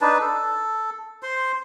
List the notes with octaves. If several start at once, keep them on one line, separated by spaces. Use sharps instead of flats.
D4 D#4 B4 A5
A4
C5 C6